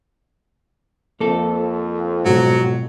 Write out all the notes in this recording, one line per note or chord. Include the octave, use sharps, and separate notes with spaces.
F2 A#3 A4
G#2 B2 F#3